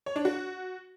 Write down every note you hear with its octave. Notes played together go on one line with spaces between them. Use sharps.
C#5
D4
F#4